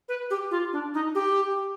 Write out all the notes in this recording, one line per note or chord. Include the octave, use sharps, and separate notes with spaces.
B4
G4
F4
D4
D#4
G4